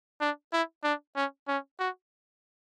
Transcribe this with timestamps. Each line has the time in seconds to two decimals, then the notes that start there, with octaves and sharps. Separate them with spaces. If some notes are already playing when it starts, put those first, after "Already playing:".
0.21 D4
0.53 E4
0.84 D4
1.16 C#4
1.48 C#4
1.79 F#4